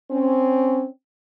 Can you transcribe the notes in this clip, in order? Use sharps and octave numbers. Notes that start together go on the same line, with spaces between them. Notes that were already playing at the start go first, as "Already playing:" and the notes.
C4 C#4